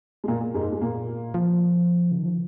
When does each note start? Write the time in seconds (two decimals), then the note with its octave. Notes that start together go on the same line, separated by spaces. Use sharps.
0.24 G#3
0.28 A#2 A#3
0.54 G#2 G#3
0.72 G#3
0.81 A#2 A#3
1.34 F3
2.11 C#3
2.19 D#3
2.25 F3